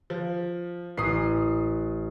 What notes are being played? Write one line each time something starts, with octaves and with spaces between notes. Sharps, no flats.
F3
A1 D#6 C7